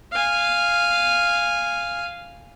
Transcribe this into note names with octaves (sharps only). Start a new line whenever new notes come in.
F5 G#5